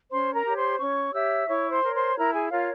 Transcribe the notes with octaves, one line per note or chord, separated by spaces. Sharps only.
C#4 C5 C6
A#4 A#5
G4 C#5
C5 C6
C#4 C#5 C#6
G4 C#5 E5 E6
E4 C#5 C#6
C5 C6
A#4 C#5
C5 C6
E4 A#4 A#5
G#4 G#5
F4 A#4 C#5 F5